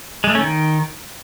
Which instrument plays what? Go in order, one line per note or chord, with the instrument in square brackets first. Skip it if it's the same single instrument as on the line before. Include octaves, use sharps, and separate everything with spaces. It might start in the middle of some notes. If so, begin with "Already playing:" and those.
[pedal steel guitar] G#3
A3
C#4
D#3